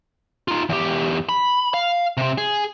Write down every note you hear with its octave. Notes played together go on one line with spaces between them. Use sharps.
D#4 F4
E2 G4
B5
F5
C3 C4
G#4